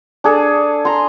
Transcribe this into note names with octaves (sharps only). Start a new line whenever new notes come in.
D4 G#4 A4
A#5 C6